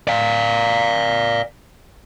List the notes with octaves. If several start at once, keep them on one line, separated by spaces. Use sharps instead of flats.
D5 F5